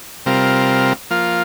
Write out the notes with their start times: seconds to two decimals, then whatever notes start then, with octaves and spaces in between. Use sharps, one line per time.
0.26 C3 G3 C4 F4 A#4
1.11 F3 A#3 F4